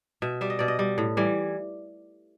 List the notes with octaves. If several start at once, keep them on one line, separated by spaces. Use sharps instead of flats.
B2 E5
G3 E5
D#5
B2 D5
D#5
G3
A2
E3 G3